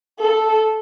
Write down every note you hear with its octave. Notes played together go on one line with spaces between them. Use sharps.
A4